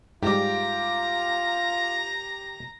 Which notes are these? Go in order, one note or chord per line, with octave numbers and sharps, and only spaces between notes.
G#2 G3 F4 G4 A#5 D6